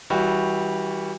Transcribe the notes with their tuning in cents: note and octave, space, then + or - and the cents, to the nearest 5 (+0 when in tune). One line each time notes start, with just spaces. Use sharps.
E3 -30 G3 +0 F#4 +0